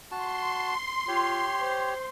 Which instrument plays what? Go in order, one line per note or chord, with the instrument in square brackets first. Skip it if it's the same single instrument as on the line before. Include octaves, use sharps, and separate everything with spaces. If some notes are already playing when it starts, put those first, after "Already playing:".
[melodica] F#4 A5 [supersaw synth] C6
[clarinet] F4 [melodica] G4 C#5
[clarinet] C5